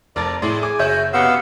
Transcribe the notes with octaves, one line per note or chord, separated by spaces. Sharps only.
F1 A#4 D5 A5 A6
A2 G#4 D5 C6
G#5 D6
F#1 F#4 G#4 C#5 E5 G6
B2 B3 F#4 G4 F5 F#5 E6